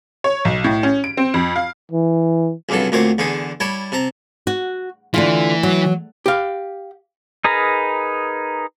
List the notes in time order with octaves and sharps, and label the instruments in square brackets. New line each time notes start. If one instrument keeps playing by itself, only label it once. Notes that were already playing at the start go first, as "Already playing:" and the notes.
[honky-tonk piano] C#5
B1
A2
C#4
D7
C4
F2
F5
[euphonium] E3
[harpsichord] C#2 G2 C3 F#3 A4
D2 A#2 C4 C#5
E2 D3 G#4
G3 E4 C#5 A5
C3 A5 A#5
[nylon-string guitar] F#4
[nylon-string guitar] D3 A3 F4 [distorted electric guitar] E3
[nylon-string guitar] F#3
[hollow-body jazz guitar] G4 F5
[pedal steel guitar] D#4 G#4 A#4 B4 A#5